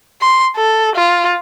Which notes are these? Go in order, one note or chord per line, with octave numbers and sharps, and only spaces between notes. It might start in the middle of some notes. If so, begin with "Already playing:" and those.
C6
A4
F4